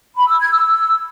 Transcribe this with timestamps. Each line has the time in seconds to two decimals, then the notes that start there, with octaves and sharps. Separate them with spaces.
0.17 B5
0.28 E6
0.40 G#6
0.51 E6